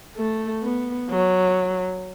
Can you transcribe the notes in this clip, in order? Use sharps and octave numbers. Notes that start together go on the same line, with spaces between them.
A3
B3
F#3